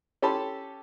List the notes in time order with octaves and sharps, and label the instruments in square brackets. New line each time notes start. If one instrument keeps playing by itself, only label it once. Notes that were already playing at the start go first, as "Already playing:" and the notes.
[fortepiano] C#4 G4 A4 A5 B5 C6